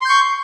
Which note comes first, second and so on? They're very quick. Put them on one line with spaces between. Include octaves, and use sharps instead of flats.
C6 G6 C#6